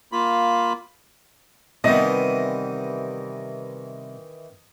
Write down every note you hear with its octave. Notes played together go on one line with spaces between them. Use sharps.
A#3 F4 B5
C3 D#3 E3 G3 B3 D#5